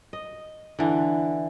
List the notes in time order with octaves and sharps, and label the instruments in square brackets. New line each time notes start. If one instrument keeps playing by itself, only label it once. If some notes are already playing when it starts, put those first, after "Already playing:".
[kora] D#5
D3 E3